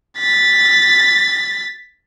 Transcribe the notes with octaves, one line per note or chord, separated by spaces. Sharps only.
A6 B6